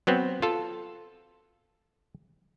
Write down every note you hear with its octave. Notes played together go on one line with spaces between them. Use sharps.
F#3 B3 C4
F4 A4